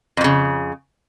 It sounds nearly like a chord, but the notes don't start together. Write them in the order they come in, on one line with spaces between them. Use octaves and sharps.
F2 A#2 C#3